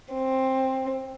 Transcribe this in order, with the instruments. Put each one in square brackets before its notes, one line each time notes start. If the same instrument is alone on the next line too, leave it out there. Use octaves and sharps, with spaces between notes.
[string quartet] C4